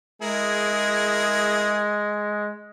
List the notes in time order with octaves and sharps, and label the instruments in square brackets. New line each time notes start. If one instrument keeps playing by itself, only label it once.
[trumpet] G#3 [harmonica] E4 G#4 A#4